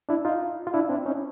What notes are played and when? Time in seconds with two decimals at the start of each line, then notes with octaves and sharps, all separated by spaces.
0.09 D4 E4
0.25 D#4 F4
0.67 F4
0.74 D4 E4
0.89 C4 D4
1.06 C#4 D#4